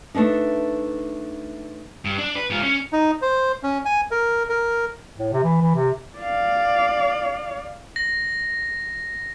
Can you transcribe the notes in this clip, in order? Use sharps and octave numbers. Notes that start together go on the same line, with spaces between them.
A3 B3 D4 D#4
G2
D4
B4
G#2 F4
C#4
D#4
C5
C#4
G#5
A#4
A#4
A2
C3
E3
E3
C3
D5 F5
A#6